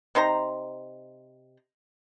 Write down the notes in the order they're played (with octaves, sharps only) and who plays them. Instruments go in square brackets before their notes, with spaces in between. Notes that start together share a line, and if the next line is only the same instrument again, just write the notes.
[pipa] C3 D#4 C5 A#5